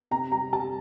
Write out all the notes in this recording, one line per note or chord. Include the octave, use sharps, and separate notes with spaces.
C3 A#5
G3 A#5
G3 A5